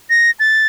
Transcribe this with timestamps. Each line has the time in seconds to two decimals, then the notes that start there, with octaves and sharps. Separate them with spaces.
0.10 A#6
0.40 A6